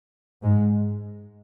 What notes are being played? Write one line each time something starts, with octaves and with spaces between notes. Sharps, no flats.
G#2 G#3